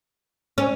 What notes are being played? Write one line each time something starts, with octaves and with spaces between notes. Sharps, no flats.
C#4